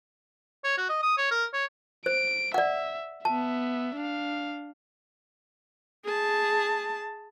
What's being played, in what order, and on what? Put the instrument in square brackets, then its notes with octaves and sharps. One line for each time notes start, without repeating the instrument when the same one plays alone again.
[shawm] C#5
F#4
D#5
D#6
C#5
A#4
C#5
[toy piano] C5 [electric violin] D7
[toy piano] D5 F#5 [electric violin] E5
[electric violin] B3 E5 [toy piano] A5
[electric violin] D4 F5
[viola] G#4 A5